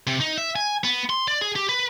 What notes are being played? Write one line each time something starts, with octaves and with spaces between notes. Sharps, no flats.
C3
D#4
E5
G#5
B3
C6
D5
G#4
G4
B4